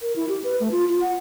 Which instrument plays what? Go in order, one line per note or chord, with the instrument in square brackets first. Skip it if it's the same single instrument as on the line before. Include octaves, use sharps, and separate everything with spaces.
[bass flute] A#4
E4
G4
B4
A3
F4
F4
F#5